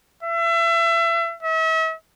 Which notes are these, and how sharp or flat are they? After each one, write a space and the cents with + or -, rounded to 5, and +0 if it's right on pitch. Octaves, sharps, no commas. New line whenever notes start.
E5 +30
E5 -40